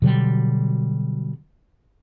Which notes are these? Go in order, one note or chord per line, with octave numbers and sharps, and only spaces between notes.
B2 D3 F#3 G3